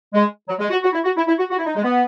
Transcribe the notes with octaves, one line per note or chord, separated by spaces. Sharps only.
G#3
F#3
G#3
F#4
F#4
E4
F#4
E4
E4
F#4
F#4
E4
D#4
G#3
B3